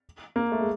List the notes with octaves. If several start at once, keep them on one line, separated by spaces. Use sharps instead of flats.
A#3
A3
G#3